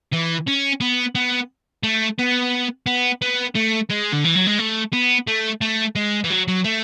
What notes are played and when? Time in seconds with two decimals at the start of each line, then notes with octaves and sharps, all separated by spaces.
0.12 E3
0.47 C#4
0.81 B3
1.15 B3
1.83 A3
2.18 B3
2.86 B3
3.22 B3
3.55 A3
3.90 G#3
4.13 D3
4.25 E3
4.36 F#3
4.47 G#3
4.59 A3
4.93 B3
5.27 A3
5.61 A3
5.96 G#3
6.24 E3
6.30 F#3
6.48 F#3
6.65 A3